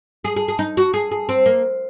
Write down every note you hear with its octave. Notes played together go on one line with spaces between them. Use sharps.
G#4
G#4
G#4
D#4
F#4
G#4
G#4
C4
A#3